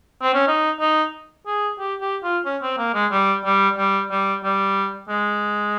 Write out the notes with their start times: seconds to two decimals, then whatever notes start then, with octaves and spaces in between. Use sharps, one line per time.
0.23 C4
0.35 C#4
0.48 D#4
0.81 D#4
1.47 G#4
1.79 G4
2.01 G4
2.23 F4
2.45 C#4
2.62 C4
2.78 A#3
2.94 G#3
3.11 G3
3.45 G3
3.78 G3
4.11 G3
4.44 G3
5.09 G#3